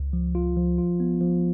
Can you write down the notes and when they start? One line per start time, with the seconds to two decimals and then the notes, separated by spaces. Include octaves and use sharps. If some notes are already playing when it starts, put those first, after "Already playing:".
Already playing: C#2
0.13 F3
0.35 F4
0.57 F3
0.78 F4
1.00 B3
1.21 F3